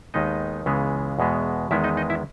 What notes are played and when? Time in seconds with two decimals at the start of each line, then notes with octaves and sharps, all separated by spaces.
0.14 D#2 D#3 G#3 B3 D#4 D#5
0.66 C#2 C#3 E3 G#3 B3
1.19 E2 B2 G#3 B3
1.71 E2 D#3 G#3 B3 E4 E5
1.84 D#4 D#5
1.97 D#4 D#5
2.10 E4 E5